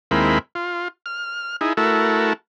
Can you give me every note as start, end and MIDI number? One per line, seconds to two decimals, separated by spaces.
0.11 0.39 39
0.11 0.39 56
0.11 0.39 58
0.11 0.39 60
0.11 0.39 64
0.11 0.39 83
0.55 0.88 65
1.06 1.56 89
1.61 1.73 63
1.61 1.73 64
1.61 1.73 68
1.77 2.33 57
1.77 2.33 64
1.77 2.33 66
1.77 2.33 69
1.77 2.33 70